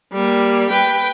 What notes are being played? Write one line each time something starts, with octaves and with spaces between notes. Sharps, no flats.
G3 A#3
B4 G5